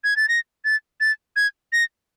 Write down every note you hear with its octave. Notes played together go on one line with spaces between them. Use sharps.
G#6
A6
A#6
A6
A6
G#6
A#6